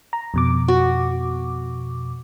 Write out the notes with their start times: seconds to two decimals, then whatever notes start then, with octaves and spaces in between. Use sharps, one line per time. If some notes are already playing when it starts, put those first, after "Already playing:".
0.13 A#5
0.34 F2 B2 D6
0.68 F#4